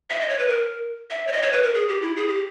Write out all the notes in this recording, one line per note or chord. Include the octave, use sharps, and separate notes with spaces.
E5
D#5
C#5
B4
A#4
E5
C#5
D#5
C#5
B4
A#4
G#4
G4
E4
G#4
G4